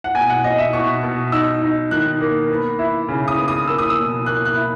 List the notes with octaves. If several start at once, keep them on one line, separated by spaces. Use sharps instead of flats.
F#5
B2 G#5
F#5
B2 D#5
E5
B2 C#6
B2
D#4 E6
D#4
D#3 F#6
A#3
B3
E4
C#3
D#6
B3
D#6
A#3 E6
D#6
E6
B2
A#3 F#6
F#6
E4